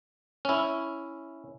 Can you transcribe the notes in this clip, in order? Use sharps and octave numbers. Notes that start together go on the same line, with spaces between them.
C#4 E4